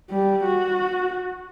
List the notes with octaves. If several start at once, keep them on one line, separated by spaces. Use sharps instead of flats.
G3
F#4